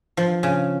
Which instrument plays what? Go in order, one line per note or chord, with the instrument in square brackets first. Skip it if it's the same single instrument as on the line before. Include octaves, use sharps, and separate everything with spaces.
[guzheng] F3
C#3